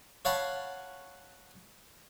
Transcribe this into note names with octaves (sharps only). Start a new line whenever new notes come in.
C#5 F5 F#5 A5 B5 C#6